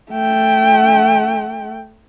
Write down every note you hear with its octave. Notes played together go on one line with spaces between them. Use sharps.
A3 G5